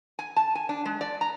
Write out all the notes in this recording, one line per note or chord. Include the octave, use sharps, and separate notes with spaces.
G#5
A5
G#5
D4
G#3
D5
A#5